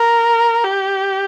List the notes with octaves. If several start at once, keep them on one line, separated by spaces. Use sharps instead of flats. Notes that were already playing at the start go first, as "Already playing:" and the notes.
Already playing: A#4
G4